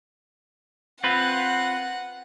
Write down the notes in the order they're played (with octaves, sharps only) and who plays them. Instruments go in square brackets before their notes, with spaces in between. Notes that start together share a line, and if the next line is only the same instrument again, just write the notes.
[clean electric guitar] C4 F4 B4 [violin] F#5